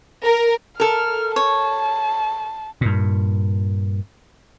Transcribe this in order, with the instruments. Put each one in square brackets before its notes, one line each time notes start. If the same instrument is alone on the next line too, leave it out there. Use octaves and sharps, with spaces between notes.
[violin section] A#4
[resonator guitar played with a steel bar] A4 A#4 [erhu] F6
[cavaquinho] C#5 [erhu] A5
[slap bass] G2 A#2